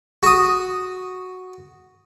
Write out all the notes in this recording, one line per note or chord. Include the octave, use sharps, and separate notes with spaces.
F#4 D#6